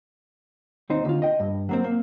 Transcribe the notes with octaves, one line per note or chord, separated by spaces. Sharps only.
D#2 C4 D#4
D2 F4
D#5 G5
G2
F#3 A#3 C4
A#3